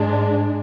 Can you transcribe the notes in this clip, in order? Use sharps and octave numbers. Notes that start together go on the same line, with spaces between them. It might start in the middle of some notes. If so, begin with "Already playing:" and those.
Already playing: G#2 G#3 D4